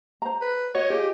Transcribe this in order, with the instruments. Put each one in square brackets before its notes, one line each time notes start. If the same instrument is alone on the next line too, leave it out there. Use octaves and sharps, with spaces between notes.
[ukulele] C5 A#5
[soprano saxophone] B4
[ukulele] F#4 [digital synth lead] C#5 [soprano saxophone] D#5
[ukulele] F4 G#4 [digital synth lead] G4